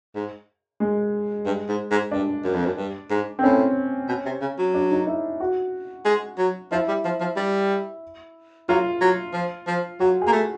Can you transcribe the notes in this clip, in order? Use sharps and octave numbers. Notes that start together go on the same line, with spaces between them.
G#2
G#3
G2
G#2
G#2
G2 D4
F#2
F2
F#2
G2
G#2
C4
A2 C#4
B2
C3
C#3
F#3
D4
D#4
E4
F#4
G#3
F#3
F3 E4
G3
F3
F3
G3
F#3 F4
F#3
F3
F3
F#3 F#4
G#4
A#3
A3